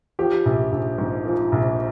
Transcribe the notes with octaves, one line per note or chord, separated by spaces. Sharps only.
F3 G4
A#1
A#1
G#2
F3
A#1